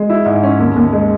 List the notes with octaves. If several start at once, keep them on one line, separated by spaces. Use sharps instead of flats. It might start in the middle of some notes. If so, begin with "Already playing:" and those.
Already playing: G#3
E4
G#2
C#4
D#2
D#2
G#3